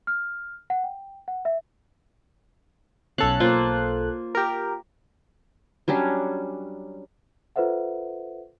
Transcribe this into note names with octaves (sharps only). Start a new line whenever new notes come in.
F6
F#5
G5
F#5
E5
B1 C#4 A4 F5 F#6
A#3 F4 C5
G4 A#4
F#3 G3 C#4 D4
F4 A4 B4 C5 E5 F#5